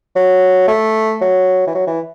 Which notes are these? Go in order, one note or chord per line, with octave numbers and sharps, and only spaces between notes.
F#3
A3
F#3
E3
F#3
E3